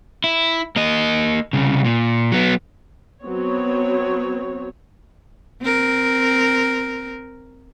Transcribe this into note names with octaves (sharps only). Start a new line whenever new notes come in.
E4
A#3 D#5
C2 C#3
A#2
F#3 B3
F#3 B3 C4 C#5
C4 A#4